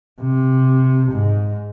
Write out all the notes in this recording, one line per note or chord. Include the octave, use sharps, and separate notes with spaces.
C3
G#2